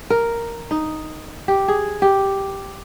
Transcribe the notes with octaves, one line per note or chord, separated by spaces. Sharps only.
A#4
D#4
G4
G#4
G4